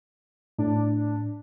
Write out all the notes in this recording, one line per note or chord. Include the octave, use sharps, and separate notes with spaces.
A2 D4